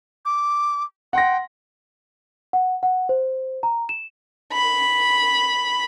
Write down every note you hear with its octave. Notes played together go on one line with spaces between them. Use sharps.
D6
F#5 G5 C6 A#6
F#5
F#5
C5
A#5
E7
B5